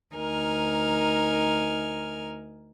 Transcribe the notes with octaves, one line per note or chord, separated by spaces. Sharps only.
D2 D#4 A#4 G#5 F6